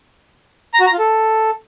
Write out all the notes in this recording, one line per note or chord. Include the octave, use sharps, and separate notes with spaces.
A#5
F#4
A#5
F4
A4